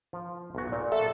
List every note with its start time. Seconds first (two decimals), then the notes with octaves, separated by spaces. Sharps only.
0.13 F3
0.55 B1 F#4
0.72 A#2 D5
0.92 A4 E5